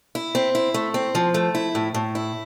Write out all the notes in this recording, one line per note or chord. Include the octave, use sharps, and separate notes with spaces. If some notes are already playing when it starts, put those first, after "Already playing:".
E4
C4
E4
A3
C4
F3
A3
E4
A2
A2
E4